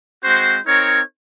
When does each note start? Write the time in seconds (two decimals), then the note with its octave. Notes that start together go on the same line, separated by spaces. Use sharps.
0.23 G#3 C4 F#4 C5
0.66 C4 D#4 A#4 C#5